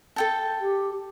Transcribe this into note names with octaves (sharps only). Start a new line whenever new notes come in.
A4 G5 A5
G4